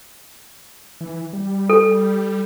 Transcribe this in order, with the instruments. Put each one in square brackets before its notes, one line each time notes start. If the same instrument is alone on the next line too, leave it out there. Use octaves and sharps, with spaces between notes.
[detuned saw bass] E3
G3
[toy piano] A4